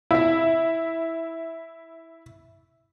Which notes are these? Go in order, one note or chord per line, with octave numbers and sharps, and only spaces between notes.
E4 E5